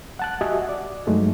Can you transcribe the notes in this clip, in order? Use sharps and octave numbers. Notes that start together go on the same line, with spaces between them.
F#5 A5 F#6
F#4 G4 D#5 E5 F#5 G#5
D5
G2 F#3 G#3 A3 D#4